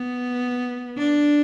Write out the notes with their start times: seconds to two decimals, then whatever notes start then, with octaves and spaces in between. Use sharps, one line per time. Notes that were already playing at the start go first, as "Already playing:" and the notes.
Already playing: B3
0.98 D4